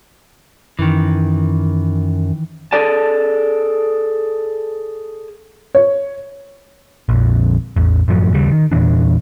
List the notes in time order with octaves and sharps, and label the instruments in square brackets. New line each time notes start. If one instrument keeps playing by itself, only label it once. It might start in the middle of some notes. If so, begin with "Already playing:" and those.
[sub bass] F#2 [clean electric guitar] D#3 E3
[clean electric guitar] G#4 A4 D5 A5
[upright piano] C#5
[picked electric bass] A#1 F2
A1 E2
F#2 A2 F3 F#3
D#2 C#3 G3
D#3
E2 A#2 E3 D4